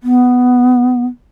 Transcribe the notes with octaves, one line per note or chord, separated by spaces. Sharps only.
B3